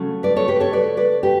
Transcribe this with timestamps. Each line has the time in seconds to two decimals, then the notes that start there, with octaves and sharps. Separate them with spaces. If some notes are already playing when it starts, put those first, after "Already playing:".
Already playing: C#3 F#3 A3
0.23 B4 D5
0.36 A4 C#5
0.48 G4 B4
0.60 A4 C#5
0.73 B4 D5
0.97 B4 D5
1.23 G4 B4